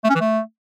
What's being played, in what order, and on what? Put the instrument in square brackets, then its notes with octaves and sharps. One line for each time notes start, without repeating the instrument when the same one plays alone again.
[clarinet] A3
C#4
E3
A3